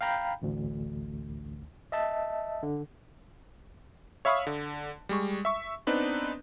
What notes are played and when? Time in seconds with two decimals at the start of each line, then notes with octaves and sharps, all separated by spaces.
0.01 F5 G5 A#5 B5 G6
0.42 A1 D2
1.92 D#5 E5 A5
2.63 D3
4.25 C#5 E5 F5 B5 C#6 D#6
4.47 D3
5.09 G3 G#3 C#6
5.45 E5 C#6
5.87 B3 C4 D4 D#4 B4